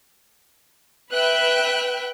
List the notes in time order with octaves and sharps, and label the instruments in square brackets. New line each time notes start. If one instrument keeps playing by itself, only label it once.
[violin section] B4 E5 G5 F#6